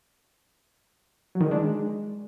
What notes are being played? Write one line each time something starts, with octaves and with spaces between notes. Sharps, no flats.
F#3
D#3
G#3
D4
G#3